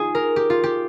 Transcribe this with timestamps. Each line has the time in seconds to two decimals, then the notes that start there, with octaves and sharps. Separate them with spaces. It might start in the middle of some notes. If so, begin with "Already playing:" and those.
Already playing: D#4 F4 G#4
0.15 A#4
0.36 G4
0.50 F4
0.64 G4